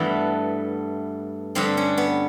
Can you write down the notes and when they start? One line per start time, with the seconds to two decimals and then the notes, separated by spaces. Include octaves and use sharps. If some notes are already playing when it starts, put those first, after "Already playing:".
Already playing: G2 E3 A3 B3
1.55 G2 D3 G3 C4
1.77 C#4
1.98 B3